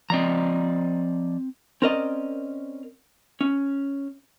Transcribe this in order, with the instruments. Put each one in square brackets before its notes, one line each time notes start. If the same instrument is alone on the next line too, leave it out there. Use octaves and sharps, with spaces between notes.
[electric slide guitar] F3 D5 D#5 [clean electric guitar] C4 A#5
[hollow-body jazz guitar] C4 C#4 A#4 D5 D#5
C#4